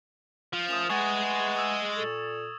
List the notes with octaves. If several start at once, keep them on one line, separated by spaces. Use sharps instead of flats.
F3
A3 C#4 A#4 D#6 E7 F7
G#3 A3 G#4 B4 F#5 C#6 G#6 A6
D#6 E6 E7
A#2 A4